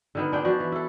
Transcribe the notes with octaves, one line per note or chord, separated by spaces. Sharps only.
D3 D#3 B3
G#3 D4 G5
F3 D4 F#4
E3
E4 A4